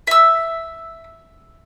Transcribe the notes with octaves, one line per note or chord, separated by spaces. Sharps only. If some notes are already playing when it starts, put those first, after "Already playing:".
E5 E6